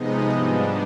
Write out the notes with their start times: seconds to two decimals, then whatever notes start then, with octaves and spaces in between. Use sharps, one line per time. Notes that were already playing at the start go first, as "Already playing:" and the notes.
Already playing: C3 F3 G#3 B3 D#4 D#5
0.31 G#2 G3 B3 D4